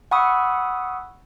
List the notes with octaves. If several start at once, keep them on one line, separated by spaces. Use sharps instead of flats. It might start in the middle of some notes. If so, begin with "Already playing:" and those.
F#5 G#5 B5 C#6 D#6 E6